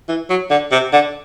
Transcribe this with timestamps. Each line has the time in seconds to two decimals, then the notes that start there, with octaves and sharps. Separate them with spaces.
0.09 E3
0.30 F#3
0.50 D3
0.72 C3
0.93 D3